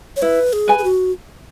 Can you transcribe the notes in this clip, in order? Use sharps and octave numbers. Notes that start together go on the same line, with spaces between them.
C#5
E4 B4
G#4
B4 G#5
G#4
F#4